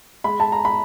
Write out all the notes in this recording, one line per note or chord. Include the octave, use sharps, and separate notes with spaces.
G#3 B5
A5
A#5
B5